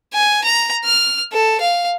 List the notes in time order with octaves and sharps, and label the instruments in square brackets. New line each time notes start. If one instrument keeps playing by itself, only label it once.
[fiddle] G#5
A#5
F6
A4
F5